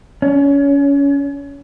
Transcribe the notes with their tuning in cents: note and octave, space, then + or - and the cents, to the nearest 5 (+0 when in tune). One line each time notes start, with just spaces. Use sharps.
C#4 +25